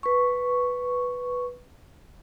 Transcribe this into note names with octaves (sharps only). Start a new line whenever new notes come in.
B4 C#6